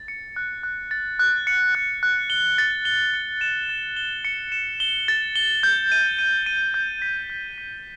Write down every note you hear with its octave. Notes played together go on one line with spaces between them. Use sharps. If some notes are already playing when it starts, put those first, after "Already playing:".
Already playing: A6
C#7
F#6
F#6
A6
F#6
C#7
F#6
F#6
G7
A6
G7
C#7
E7
A6
G7
C#7
E7
G7
A6
G7
G6
D#7
D#7
D#7
G6
B6
G6
B6